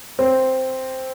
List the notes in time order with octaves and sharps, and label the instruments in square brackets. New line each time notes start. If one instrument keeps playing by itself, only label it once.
[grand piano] C4